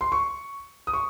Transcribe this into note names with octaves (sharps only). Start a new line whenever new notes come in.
C6
C#6
D#6
C#6